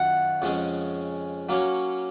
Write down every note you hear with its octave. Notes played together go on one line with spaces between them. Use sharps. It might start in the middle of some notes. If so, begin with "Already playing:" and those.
Already playing: F#2 D#3 F#3 F4 F#5
F2 C#3 G#3 C#4 G#4
F#3 A#3 C#4 F#4 C#5